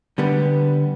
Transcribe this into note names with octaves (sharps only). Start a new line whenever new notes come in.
D3 G3 B3